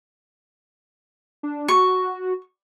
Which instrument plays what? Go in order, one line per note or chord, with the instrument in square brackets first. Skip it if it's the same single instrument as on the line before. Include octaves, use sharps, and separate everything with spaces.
[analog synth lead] D4
[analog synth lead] F#4 [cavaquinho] C#6